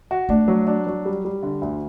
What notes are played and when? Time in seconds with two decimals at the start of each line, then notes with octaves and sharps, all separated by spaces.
0.11 F#4
0.29 A3 D4
0.48 F#3
0.67 D4
0.87 F#3
1.06 G3
1.25 G3
1.43 D3
1.62 D2